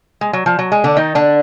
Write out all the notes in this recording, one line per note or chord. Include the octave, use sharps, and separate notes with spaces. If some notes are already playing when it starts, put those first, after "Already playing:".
G#3
F#3
F3
F#3
G#3
D3 D4
D#3 D#4
D3 D4